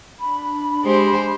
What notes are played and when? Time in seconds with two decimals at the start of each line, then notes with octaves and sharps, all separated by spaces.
0.19 D4 B5
0.84 G#3 G4 C5